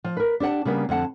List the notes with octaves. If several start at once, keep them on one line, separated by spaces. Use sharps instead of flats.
F3
A#4 B4
D4 G4 C5 F#5 A5
C#3 G3 A#3 B3
F2 D3 F#5 A5